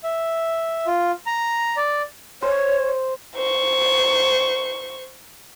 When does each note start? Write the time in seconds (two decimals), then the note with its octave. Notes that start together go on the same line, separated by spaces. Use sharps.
0.04 E5
0.86 F4
1.26 A#5
1.77 D5
2.42 C5 C#5
3.35 C5 C#6